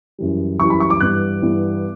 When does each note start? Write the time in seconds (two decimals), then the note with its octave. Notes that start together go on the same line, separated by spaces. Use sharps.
0.18 F#2 E3 G3
0.59 F#2 E3 G3 C#6
0.70 B5
0.80 C#6
0.90 D6
1.01 G2 E3 B3 F#6
1.42 G2 E3 B3